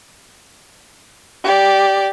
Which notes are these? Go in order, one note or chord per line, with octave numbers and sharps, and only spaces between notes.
G4 D5